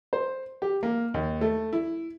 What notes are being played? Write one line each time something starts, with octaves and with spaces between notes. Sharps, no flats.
C5
G4
A#3
D#2
A3
E4